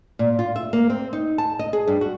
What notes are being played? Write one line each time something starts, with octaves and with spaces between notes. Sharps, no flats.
A#2
F4
E5
A#3
C4
D#4
A5
D#5
G#4
G2
F#4